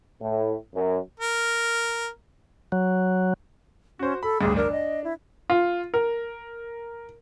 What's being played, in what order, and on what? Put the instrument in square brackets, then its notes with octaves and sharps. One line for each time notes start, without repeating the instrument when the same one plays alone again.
[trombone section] A2
F#2
[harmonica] A#4
[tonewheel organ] F#3
[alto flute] C#4 [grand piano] F#4 C5
[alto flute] A4 [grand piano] B5
[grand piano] A1 D2 G2 [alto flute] G#4
[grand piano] D4 [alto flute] A#4
[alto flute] D#5
E4
[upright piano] F4
A#4